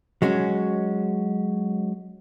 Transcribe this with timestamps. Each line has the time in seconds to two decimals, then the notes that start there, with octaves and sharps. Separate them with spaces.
0.22 F#3 G#3 C#4 F#4